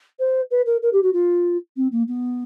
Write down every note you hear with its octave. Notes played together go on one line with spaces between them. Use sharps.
C5
B4
A#4
A#4
G4
F#4
F4
C4
A#3
B3